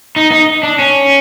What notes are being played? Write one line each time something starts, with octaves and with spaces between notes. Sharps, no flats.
D#4
D#4
D4
C#4